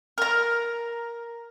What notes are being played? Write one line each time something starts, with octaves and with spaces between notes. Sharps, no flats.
A#4 A#5